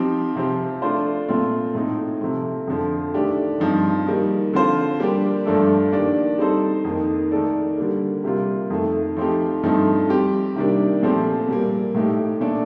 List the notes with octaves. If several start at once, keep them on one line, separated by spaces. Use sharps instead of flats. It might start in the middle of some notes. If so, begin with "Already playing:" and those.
Already playing: F3 C4 D#4 G4
C3 F3 C4 G4
A3 D4 F4 C5
A#2 A3 C4 F4
A2 A3 C4 D#4
C3 F3 A3 C4
F2 D3 F3
D#3 A3 D4 G4
G2 F3 C4 D#4
D#3 G3 A#3 D#4
D3 F3 C4 F4 C5
G3 A#3 D4 G4
G2 F3 A3 D4 A4
D#3 A#3 D4 G4 D5
G3 C4 D#4 A4 C5
F2 D#3 A#3 D#4
D#3 A3 D#4 A4 D5
D3 G3 A#3
C3 G3 A#3 F4
F2 D#3 A3
F3 A3 C4 D#4 G4
G2 F3 A3 C4 D#4
G3 C4 G4
C3 D#3 G3 A#3 D4
A#2 F3 A3 C4 G4
A#2 G3 A#3
A2 A3 D#4 G4
A#2 A3 D4 A4 D5